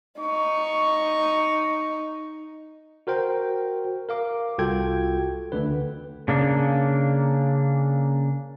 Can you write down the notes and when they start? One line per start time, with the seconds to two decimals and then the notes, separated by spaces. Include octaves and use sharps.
0.20 D#4 C#6
3.07 F#4 A#4 C5 G5
4.09 A#4 F5 D6
4.58 C2 F4 F#4 A4 G5 G#6
5.52 D2 D3 B4
6.28 C#3 A#3 D4